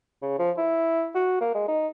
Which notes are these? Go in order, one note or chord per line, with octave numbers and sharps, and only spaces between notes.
C#3
F3
E4
F#4
A#3
G#3
D#4